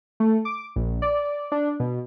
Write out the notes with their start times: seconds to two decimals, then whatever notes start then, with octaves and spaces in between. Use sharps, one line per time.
0.20 A3
0.45 D6
0.76 A#1
1.02 D5
1.52 D4
1.80 B2